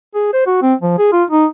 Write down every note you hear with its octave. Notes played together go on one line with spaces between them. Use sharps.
G#4
C5
F#4
C4
F3
G#4
F4
D#4